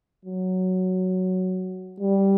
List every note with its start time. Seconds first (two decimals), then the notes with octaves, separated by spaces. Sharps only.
0.25 F#3
2.00 G3